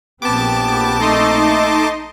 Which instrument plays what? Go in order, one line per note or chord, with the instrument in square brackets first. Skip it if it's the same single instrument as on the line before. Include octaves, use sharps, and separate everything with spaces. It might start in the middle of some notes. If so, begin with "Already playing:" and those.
[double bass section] A#1 C4 [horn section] B3 G4 [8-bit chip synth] A5 D6
[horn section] A3 [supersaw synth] D#4 D#5 C6